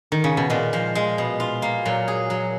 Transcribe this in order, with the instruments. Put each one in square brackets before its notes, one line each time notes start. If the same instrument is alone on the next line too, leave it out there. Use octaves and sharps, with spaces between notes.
[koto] D#3
C#3
B2
[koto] A#2 [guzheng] G#3
[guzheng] F3
G#3
B2
F4
A#3
[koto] A#2 [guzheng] F#3
[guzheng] G#4
F#3